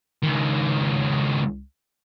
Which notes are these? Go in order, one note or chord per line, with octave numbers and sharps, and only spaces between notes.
C#2 D#3